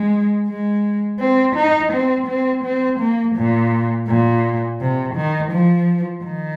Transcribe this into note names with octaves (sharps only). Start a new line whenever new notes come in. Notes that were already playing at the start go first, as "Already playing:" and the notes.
Already playing: G#3
G#3
C4
D#4
C4
C4
C4
A#3
A#2
A#2
C3
D#3
F3
D#3